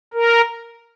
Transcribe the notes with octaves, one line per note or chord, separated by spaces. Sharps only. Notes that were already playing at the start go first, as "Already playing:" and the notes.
A#4